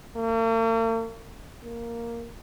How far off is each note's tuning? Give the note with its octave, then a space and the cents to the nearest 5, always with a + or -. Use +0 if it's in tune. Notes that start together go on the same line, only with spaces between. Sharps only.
A#3 -45
A#3 +0